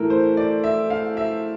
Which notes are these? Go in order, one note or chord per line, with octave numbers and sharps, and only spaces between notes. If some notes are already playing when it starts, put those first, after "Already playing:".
Already playing: A2 E3 A4 A#4
C5
D5
E5
F5
E5